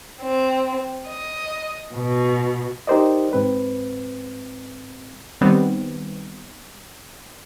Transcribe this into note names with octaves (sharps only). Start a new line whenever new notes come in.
C4
D#5
B2
D#4 G4 A#4 C5 D5 D#5
G#2 C4 B4
D#3 G3 B3 C4